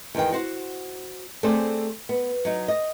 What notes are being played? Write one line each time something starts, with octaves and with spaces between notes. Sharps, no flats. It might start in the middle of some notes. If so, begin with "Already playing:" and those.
E2 D#3 G5
F#4 C5 F#5
A3 C4 G#4 A4 C5 D5
B3
F#3 D#4
D#5